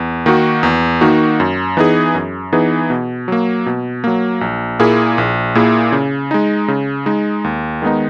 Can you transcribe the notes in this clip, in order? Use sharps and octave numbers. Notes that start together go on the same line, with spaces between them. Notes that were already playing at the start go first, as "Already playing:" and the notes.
Already playing: E2
D#3 A#3 D#4 F#4
E2
D#3 A#3 D#4 F#4
F#2
E3 B3 D#4 G#4
F#2
E3 B3 D#4 G#4
B2
F#3 A#3
B2
F#3 A#3
A#1
A#2 A#3 E4 G#4
A#1
A#2 A#3 E4 G#4
C#3
G#3 D#4
C#3
G#3 D#4
D#2
D#3 G#3 B3 D#4